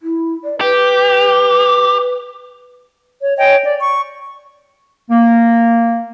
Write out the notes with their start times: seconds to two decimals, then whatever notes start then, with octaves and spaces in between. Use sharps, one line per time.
0.02 E4
0.44 D5
0.61 G4 B4
3.20 C#5
3.38 C#5 D#5 G5 G#5
3.65 D5
3.79 C#6
5.10 A#3